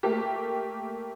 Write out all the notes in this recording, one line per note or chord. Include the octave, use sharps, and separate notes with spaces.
A3 A#3 G4